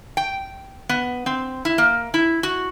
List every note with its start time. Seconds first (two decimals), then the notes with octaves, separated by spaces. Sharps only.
0.17 G5
0.89 B3
1.26 C4
1.65 E4
1.78 A#3
2.14 E4
2.43 F#4